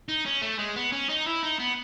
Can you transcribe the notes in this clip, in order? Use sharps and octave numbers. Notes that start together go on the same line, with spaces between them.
D#4
C#4
A3
G#3
B3
C#4
D#4
E4
D#4
B3